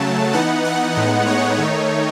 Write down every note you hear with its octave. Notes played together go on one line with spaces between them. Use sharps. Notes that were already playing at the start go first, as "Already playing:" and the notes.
Already playing: C#3 F#3 A3 A5
E3 B3 D#4 F#5
F#5
A2 G#3 B3 D#4
C#5
D#3 A3 D#4